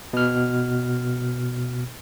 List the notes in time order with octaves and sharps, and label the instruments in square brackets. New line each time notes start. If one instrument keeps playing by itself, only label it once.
[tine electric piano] B2 F6